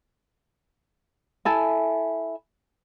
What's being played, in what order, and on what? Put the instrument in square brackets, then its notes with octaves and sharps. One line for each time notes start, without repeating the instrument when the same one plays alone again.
[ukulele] E4 A4 G#5